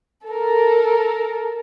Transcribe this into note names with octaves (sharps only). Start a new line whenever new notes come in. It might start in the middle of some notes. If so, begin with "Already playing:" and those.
A4 A#4